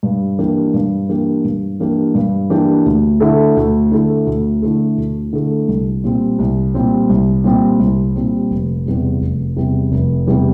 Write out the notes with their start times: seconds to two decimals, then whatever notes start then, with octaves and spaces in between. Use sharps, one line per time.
0.03 G2
0.38 E3 A#3 D4 G4
0.74 G2
1.09 E3 A#3 D4 G4
1.44 G2
1.80 E3 A#3 D4 G4
2.14 G2
2.50 E3 A#3 D4 G4
2.86 D2
3.20 D3 A3 E4 A4
3.57 D2
3.91 D3 A3 E4 A4
4.26 D2
4.62 D3 A3 E4 A4
4.97 D2
5.33 D3 A3 E4 A4
5.68 C2
6.04 A#2 G3 C4
6.39 C2
6.74 A#2 G3 C4
7.09 C2
7.44 A#2 G3 C4
7.80 C2
8.16 A#2 G3 C4
8.51 F1
8.86 E2 C3 G3
9.21 F1
9.57 E2 C3 G3
9.92 F1
10.27 E2 C3 G3